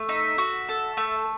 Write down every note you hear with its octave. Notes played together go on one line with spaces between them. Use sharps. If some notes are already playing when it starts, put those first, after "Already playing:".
Already playing: A3
D#4 E5
F#4
A4
A3